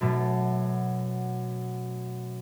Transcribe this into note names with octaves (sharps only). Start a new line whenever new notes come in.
F#2 B2 A3